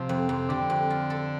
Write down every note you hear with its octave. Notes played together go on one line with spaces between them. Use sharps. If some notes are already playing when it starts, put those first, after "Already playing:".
Already playing: C3 F3
F2
F2
D3 G3
F2
F4
A4